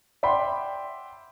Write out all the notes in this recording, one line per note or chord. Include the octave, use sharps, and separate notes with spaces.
D5 E5 F#5 G5 B5 C6